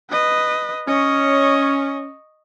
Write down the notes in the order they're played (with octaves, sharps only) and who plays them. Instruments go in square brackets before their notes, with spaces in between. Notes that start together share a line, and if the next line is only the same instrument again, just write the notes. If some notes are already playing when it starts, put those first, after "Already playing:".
[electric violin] B4 D#5
[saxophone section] C#4 [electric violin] D#5 C#6